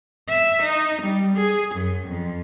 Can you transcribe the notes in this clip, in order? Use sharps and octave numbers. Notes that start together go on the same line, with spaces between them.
E5
D#4
G3
G#4
F#2
F2